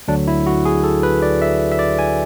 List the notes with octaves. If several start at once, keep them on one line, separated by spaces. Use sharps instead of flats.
D2 D3 F#3 D4
E4
F#4
G#4
A4
B4
D5
E5
E5
D5
G#5